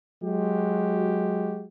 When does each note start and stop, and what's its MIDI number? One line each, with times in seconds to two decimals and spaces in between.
0.22 1.65 54
0.22 1.65 56
0.22 1.65 66
0.22 1.65 67